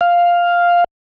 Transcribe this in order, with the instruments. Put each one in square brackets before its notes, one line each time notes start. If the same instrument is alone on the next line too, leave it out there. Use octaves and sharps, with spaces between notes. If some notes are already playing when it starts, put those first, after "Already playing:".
[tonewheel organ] F5